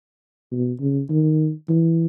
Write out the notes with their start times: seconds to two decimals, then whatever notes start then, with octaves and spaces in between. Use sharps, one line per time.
0.51 B2
0.80 C#3
1.10 D#3
1.69 E3